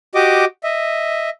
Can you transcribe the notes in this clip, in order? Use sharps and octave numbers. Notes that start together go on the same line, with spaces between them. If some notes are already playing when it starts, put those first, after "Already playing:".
F#4 G4 D#5 D6
D#5 E5